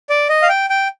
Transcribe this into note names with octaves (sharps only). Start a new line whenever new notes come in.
D5
D#5
F5
G5
G5